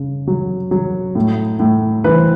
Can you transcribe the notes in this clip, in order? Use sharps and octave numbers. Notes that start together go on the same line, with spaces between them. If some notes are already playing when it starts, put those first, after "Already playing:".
Already playing: C#3
F#3
F#3
A2
A2
E3 B4
C5